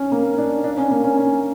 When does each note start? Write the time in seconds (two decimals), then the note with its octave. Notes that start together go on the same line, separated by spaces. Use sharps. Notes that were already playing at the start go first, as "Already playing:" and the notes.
Already playing: C#4
0.12 A#3
0.38 D4
0.64 D4
0.77 C#4
0.91 A#3
1.04 C#4
1.17 C#4